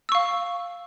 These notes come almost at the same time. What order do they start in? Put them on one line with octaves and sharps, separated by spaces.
E6 C#6 F5